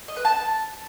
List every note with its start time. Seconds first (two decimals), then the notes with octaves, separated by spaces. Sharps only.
0.08 D#5
0.16 B4
0.25 A5